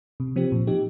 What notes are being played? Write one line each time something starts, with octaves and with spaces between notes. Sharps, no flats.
C3
F3 C4 G4
A#2
F3 D#4 G4